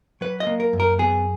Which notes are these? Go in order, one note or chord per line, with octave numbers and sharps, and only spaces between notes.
F#3 B4
D#5
A#3
A#4
F#2
A#4
B3 G#4